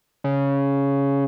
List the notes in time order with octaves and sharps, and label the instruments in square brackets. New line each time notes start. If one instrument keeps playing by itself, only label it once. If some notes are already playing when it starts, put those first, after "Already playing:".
[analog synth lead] C#3